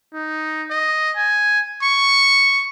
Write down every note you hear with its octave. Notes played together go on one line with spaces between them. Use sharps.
D#4
D#5
G#5
C#6